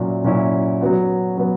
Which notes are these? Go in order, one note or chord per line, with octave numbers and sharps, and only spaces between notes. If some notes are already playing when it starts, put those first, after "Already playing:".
Already playing: A#2 F#3 C#4 E4
A#2 F#3 C#4 E4
F#3 B3 F#4
F#3 B3